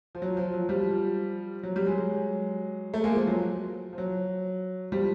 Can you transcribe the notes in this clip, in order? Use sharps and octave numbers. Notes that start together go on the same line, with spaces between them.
F3
F#3
F3
F#3
F3 G3
F#3
G3
F#3 G#3
A3
G#3 A#3
F3
F#3
F3
F#3
F3 G3